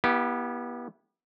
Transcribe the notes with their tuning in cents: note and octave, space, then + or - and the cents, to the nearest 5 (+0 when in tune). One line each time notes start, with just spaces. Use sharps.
B3 -30 E4 +0 G4 +0